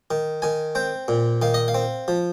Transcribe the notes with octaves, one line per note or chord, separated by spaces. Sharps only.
D#3
D#3 G#5
C4 G5
A#2
D#3 F5
D#5
F5
C4
F3